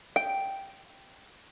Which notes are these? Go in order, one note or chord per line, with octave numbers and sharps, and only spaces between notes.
G5